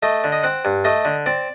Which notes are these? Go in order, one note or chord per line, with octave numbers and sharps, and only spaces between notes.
A3 D#5
D3
D#5
C4 F#5
G2
A3 D#5
D3
C4 D5